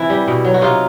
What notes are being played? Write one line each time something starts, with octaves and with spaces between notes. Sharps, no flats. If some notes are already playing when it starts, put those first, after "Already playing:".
Already playing: C3 E3 E4
G3
B2
F#3
F#4
C3 D#4 F4